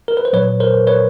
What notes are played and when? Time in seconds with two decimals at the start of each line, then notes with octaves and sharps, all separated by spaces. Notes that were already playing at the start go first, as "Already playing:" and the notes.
0.08 A#4
0.17 B4
0.25 C5
0.33 A#2 F#3 B4 C#5
0.60 A#4 C5
0.87 B4 C#5